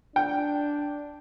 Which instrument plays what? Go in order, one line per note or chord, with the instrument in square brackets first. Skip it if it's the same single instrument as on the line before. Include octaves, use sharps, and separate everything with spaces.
[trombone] D4 [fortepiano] G5